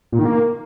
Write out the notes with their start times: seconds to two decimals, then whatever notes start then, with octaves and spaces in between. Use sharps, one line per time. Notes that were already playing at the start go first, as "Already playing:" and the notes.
0.13 A#2
0.19 D#3
0.25 A#3